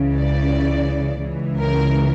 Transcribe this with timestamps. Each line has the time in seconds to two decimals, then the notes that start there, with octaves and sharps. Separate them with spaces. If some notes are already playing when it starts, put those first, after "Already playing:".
Already playing: C#2 C#3 E3
0.15 D5
1.22 C#2 C#3 E3
1.58 A#4